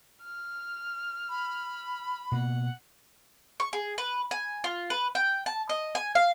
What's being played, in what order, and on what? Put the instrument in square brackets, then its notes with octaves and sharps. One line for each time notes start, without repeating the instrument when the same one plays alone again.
[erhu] F6
[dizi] B5
[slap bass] B2 A#3 [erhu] F#5
[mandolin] C#6
G#4
B4
G#5
F4
B4
G5
A5
D#5
G#5
F5